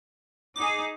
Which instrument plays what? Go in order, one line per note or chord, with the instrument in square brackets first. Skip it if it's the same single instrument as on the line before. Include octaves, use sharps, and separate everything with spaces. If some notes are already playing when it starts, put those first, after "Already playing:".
[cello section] D#4 G#4 [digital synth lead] D6